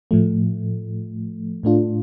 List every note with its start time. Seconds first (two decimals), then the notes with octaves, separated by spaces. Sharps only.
0.11 A2 F3 A3
1.63 A2 A3 D4 F4